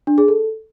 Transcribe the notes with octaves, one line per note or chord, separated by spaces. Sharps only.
D4
G#4
A4